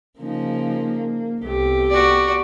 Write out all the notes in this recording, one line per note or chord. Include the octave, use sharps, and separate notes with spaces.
C#3 F3 A#3 D#4
C2 A3 B3 G4
F#4 D5